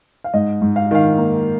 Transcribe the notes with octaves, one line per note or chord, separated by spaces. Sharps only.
F5
G#2 D#5
G#2
F5
D#3 F5
A#3